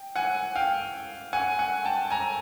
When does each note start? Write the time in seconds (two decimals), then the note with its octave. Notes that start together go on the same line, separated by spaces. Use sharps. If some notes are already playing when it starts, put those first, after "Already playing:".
Already playing: G5
0.16 F#5 G#5
0.55 F5 G5
1.33 F#5 G#5
1.59 F#5 G#5
1.84 G5 A5
2.10 G#5 A#5